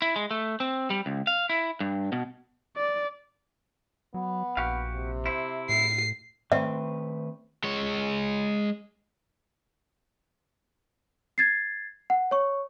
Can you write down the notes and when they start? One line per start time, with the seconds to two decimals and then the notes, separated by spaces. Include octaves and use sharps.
0.02 E4
0.16 G#3
0.31 A3
0.60 C4
0.90 G3
1.06 C#2
1.27 F5
1.50 E4
1.80 G2
2.12 B2
2.76 D5
4.14 F#3 B3
4.57 A#1 F#4 G4 F5
4.94 C3
5.26 E4 C5
5.69 A2 C7
6.52 D#3 A3 C4 B4 E5
7.64 G#3 C#5
11.38 G#6 A6 C7
12.10 F#5
12.31 C#5 C#6